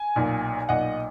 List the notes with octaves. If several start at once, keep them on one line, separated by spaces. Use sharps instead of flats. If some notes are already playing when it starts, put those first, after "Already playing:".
Already playing: G#5
B1 A#2
B1 A#2 D#5 F#5